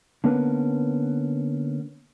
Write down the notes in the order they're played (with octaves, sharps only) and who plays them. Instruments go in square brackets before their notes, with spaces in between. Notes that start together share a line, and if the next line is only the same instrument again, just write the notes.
[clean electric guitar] D3 A#3 B3 C#4 A#4 B4